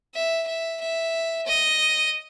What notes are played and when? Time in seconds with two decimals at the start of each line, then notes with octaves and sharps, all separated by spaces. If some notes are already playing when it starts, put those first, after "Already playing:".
0.14 E5
0.48 E5
0.81 E5
1.47 D#5